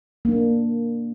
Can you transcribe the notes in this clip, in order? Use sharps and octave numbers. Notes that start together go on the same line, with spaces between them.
A#3 D4